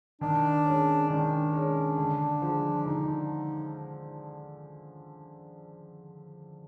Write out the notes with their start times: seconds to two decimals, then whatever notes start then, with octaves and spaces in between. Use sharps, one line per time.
0.21 D#3 D4
0.65 G#3 C#4
1.10 D#3 D4
1.53 G#3 C#4
1.98 D3
2.42 F3 G#3
2.86 D3 D#4